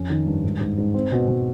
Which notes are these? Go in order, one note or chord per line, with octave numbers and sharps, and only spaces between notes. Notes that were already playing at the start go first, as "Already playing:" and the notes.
Already playing: F2 C#4
D#3
G2
G#2
G#2
G#2
C4
B2
B2